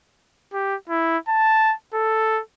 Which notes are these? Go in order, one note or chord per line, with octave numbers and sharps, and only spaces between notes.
G4
E4
A5
A4